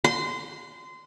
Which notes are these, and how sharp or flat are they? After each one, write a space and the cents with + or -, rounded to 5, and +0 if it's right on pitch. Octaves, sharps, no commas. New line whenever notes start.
C6 -25